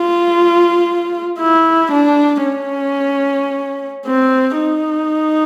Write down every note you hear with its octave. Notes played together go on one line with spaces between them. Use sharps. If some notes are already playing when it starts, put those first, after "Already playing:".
Already playing: F4
E4
D4
C#4
C4
D#4